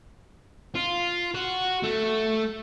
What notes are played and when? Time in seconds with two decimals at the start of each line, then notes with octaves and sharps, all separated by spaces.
0.75 F4
1.35 F#4
1.84 A3